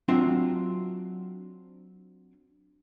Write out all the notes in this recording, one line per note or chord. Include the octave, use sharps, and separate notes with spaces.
F#3 C4 D4 F4 E5 G5